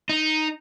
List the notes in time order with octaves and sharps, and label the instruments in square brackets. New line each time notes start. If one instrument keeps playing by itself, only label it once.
[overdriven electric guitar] D#4